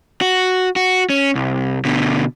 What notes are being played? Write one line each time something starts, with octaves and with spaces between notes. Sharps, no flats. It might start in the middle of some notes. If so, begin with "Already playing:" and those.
F#4
F#4
C#4
C2
B2 D3